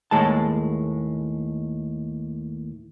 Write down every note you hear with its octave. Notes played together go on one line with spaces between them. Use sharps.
D#2 A2 G#3 A5